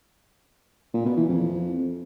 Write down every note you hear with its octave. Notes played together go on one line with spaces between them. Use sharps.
A#2
B2
E3
F2